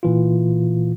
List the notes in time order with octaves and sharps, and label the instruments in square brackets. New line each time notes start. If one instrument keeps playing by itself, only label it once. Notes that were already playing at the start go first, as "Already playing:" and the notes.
[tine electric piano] A#2 E3 F4